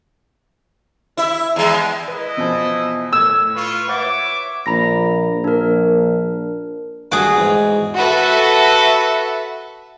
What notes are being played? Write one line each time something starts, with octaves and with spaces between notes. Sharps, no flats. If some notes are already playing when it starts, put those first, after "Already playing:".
E4 E5
E2 G#3
E4 B4 D#5
E2 B2 F3
A2 E6 G#6
F4 B4 C#6
B4 C#5 E5 F#5 D6 A6
A#1 A#5 B5 A#6
A#1 D4 A#4
G2 A3 F#4 G#4 D6
E2 G#2
F#4 A4 B4 E5